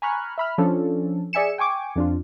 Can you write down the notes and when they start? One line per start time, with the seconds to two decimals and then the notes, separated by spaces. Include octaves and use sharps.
0.02 G#5 A#5 B5 C#6 F6 F#6
0.38 E5 B5 F6
0.58 F3 C#4 D4 A4
1.33 G#4 D5 E5 G#5 C#7 E7
1.58 G5 G#5 C#6 D6
1.96 F2 D4 F4